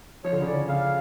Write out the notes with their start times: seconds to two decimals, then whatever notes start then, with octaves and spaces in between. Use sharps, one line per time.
0.24 F3 C#5
0.32 D3
0.41 C#3
0.47 D3 D5
0.68 C#3 F5